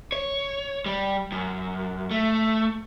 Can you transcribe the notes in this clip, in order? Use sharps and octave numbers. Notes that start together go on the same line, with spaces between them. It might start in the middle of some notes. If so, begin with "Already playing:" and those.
C#5
G3
F#2
A3